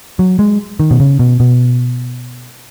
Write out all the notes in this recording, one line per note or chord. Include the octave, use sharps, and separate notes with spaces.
F#3
G#3
D#3
B2
C#3
B2
B2